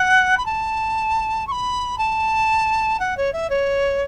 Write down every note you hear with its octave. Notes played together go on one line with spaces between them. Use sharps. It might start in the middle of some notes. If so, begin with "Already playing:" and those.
Already playing: F#5
B5
A5
C#6
B5
A5
F#5
C#5
E5
C#5